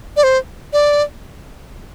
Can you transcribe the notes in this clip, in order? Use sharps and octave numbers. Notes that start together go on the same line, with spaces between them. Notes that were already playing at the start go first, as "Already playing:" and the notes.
D5
C5
D5